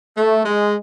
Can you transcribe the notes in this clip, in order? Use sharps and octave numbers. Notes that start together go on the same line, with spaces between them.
A3
G#3